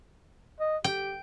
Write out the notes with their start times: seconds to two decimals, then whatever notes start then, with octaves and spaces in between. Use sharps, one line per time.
0.60 D#5
0.84 G4 G5